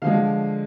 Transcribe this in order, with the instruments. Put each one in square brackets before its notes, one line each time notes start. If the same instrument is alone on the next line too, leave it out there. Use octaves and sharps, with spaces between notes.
[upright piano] D3 F3 G#3 F5